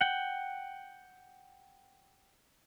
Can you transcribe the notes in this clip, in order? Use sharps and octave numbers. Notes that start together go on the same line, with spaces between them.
F#5 G5